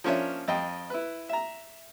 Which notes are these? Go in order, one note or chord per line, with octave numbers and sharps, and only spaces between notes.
F3 A#3 C#4 D4 C#5 E5
F2 D#5 G5
E4 B4
E5 A#5